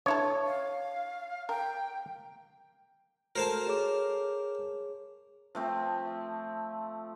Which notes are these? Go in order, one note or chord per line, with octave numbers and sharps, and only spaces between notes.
D4 E4 A4 C#5
F5
A#4 G5
F#4 A4 A#4 C5 A5
G#4 C#5 D6
F3 A3 C4